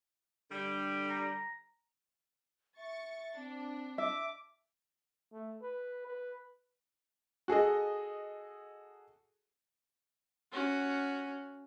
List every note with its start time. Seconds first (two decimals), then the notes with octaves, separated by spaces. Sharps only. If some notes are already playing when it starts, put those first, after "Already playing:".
0.51 D3 G3
1.10 A#5
2.77 E5 C#6 A6
3.36 C4 D4
3.98 E5 D6
5.32 A3
5.62 B4
6.07 B4
7.48 F#4 G#4 A4 D#5
10.52 C#4 F#4